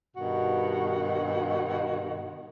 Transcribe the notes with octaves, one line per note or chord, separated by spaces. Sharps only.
G2 B2 D#3 D#4 F#4